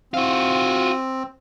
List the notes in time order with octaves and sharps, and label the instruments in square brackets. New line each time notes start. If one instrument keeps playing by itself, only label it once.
[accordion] C4 [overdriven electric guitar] F4 F#4